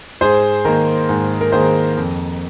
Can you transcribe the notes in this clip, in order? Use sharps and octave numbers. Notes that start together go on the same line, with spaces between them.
G#2 G#4 C5
D#3 A#3 A#4
G#2
A#4
D#3 A#3 G#4 C5
F2